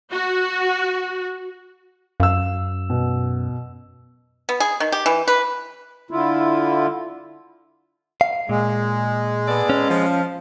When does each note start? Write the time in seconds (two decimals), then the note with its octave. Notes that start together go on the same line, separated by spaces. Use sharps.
0.11 F#4
2.20 F#2 F5 E6
2.90 B2
4.49 B3
4.60 G#4
4.80 D#3
4.92 G4
5.06 E3
5.28 B4
6.11 D3 E4 F4
8.21 F5
8.49 A#2 G#3
9.47 B3 A4 D5
9.70 C#4
9.89 F3